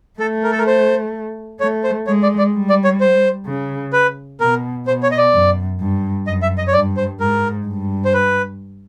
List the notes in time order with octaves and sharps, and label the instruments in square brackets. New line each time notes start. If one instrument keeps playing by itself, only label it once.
[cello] A3 [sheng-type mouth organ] A4
[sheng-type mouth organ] A#4
A4
A#4
C5
[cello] A3 [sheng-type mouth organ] C#5
[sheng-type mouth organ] C5
[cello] G#3 [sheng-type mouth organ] C#5
[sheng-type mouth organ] D5
D5
[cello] G3
[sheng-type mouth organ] D5
C#5
C5
[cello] C#3
[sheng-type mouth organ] B4
[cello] B2 [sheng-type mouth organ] A#4
[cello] B2 [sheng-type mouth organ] C5
[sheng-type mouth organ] C#5
D#5
D5
[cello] F#2
G2
[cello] F#2 [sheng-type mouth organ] D#5
[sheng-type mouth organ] E5
D#5
C#5
[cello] G2 [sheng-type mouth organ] D5
[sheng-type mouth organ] C5
[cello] G#2 [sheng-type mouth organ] A#4
[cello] G2
[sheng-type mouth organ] C5
B4